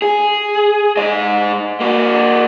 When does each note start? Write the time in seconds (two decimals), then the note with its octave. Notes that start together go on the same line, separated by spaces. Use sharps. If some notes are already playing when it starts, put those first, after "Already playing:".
0.02 G#4
0.97 G#2 D#5
1.80 A#3 F#4